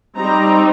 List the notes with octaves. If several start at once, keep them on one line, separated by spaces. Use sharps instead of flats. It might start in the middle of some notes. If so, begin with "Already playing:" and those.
G3 C4 D#4 A#5